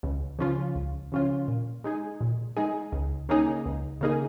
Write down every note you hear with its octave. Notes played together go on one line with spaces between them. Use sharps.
C#2
C#3 F3 C#4 F4
C#2
C#3 F3 C#4 F4
A#2
G#3 D#4 G#4
A#2
G#3 D#4 G#4
C#2
C#3 A#3 D#4 G#4
C#2
C#3 A#3 D#4 G#4